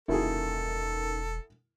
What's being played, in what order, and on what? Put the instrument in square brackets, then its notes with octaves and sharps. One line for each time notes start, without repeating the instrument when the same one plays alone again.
[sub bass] E1 [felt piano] F#2 D#3 A#3 [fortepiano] E4 F#4 G#4 [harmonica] A4